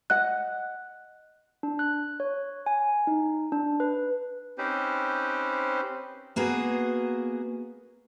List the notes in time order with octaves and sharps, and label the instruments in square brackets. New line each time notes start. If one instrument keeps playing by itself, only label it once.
[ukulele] D#5 F#5 [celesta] F#6
[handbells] D4
F#6
C#5
G#5
D#4
D4
B4
[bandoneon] C4 C#4 D#4 G4 B4 C5
[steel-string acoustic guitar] A#3 B3 F#4 G#4